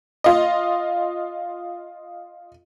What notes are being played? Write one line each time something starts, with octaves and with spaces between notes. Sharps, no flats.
F4 D#5